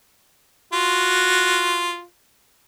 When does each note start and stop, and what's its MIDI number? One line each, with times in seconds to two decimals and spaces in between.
0.73 2.03 65
0.73 2.03 66